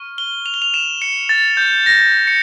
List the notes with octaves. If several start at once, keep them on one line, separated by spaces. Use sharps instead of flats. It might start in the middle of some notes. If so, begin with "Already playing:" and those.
Already playing: C#6 F6
G7
F7
G7
F7
E7
C#7
A6
G6
A#6
C#7